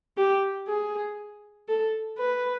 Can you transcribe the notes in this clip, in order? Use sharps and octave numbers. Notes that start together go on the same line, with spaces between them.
G4
G#4
A4
B4